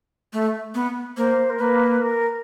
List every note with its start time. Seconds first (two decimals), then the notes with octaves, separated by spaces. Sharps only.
0.33 A3
0.75 B3
1.17 A#3 C5
1.50 A#4
1.59 A#3 B4
2.01 A#4